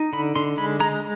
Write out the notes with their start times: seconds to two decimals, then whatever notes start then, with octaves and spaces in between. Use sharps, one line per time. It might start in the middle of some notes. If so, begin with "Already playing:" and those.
Already playing: D#4
0.13 D3 B5
0.36 D3 C6
0.58 G#3 B5
0.80 G#3 A#5